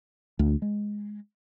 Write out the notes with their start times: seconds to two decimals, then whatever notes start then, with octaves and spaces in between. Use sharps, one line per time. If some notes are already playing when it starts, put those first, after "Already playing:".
0.39 D2
0.62 G#3